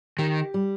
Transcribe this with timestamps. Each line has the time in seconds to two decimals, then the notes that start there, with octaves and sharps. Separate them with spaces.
0.19 D#3 G4
0.54 G3